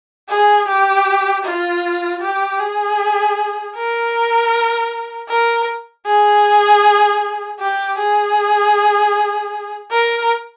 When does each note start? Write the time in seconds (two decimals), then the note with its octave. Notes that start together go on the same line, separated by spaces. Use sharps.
0.29 G#4
0.68 G4
1.45 F4
2.22 G4
2.59 G#4
3.76 A#4
5.29 A#4
6.06 G#4
7.60 G4
7.99 G#4
9.91 A#4